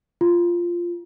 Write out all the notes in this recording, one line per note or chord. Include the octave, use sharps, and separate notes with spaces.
F4